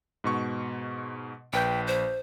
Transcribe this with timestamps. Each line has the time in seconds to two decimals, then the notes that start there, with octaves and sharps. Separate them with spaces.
0.24 G#2 B2 C#6
1.53 A#1 B4 G5 G6
1.87 C5